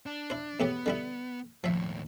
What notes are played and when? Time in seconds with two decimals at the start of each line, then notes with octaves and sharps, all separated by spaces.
0.06 D4
0.30 E4 C5
0.60 E2 A2 B3 G4
0.86 D3 G3 E4
1.64 D#2 A2 F3 E5